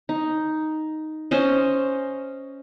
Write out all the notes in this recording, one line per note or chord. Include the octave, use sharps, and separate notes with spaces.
D#4
C#4 C5 D#5